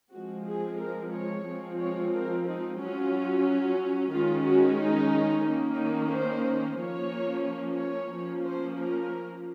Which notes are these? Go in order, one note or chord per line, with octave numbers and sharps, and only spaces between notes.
F3 G#3 C4 F#4
G#4
A#4
C#5
F3 G#3 C4
C#5
A#4
D#4
F#3 C#4 F4
D#3 G#3 C#4 F4
F#4
D#4
D#3 A#3 C#4
D#4
C5
F3 A#3 C#4 C#5
C#5
F3 A#3 C#4
C5
A#4